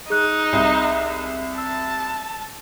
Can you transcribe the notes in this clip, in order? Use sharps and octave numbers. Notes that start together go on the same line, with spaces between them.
D#4 G#4 F#6
C2
A5 E6